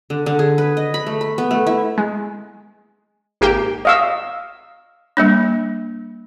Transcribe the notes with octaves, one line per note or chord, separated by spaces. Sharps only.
D3
D3
G#4
B4
D#5
B5
A3
B5
B3
A3
E4
G#3
G#1 A#3 G4 G5
D#5 F5 E6
G3 A#3 D4